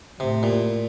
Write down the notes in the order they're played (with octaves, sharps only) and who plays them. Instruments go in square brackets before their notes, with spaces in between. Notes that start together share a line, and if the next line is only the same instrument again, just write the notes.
[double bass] A2 [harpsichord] C3
[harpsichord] A#2